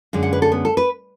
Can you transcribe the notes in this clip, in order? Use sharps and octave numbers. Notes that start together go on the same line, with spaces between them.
F#2 D3 G#3
F#5
B4
A4
B3
A4
B4